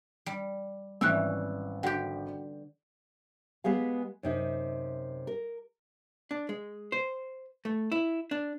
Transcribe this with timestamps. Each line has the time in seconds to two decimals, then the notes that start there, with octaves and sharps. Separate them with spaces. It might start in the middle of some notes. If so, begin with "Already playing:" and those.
0.26 G3
1.01 G#1 E3 G3 C#4 E6 F#6
1.83 D3 F#4 G4 F#5 G5
3.64 G#3 B3 G4 G#4 F5
4.23 F#2 C3 D#4
5.27 A#4
6.31 D4
6.49 G#3
6.92 C5
7.65 A3
7.92 E4
8.31 D4